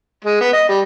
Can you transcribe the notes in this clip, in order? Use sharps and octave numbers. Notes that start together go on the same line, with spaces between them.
G#3
B3
D#5
G3